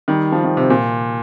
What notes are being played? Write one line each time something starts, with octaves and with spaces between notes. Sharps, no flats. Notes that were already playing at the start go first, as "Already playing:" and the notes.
D#3 G3
F3
D#3
C3
A#2